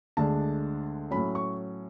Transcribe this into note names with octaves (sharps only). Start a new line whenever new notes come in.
D2 D3 G#3 D4 A5
A2 F#3 C#4 B5
C#6